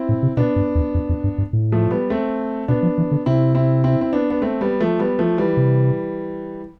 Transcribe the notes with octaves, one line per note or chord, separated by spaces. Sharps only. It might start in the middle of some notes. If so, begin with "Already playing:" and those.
Already playing: C4 E4
A2
C3
B2 B3 D4
G2
E2
F2
F2
G2
G2
A2
F3 A3
G3 B3
A3 C4
B2 B3 D4
F3
E3
D3
C3 C4 E4
C4 E4
C4 E4
C4
B3 D4
B3
A3 C4
G3 B3
F3 A3
G3 B3
F3 A3
E3 G3
C3